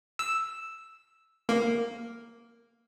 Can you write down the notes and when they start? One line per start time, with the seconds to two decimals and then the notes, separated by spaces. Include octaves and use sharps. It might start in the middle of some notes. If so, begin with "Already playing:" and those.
0.19 E6
1.49 A#3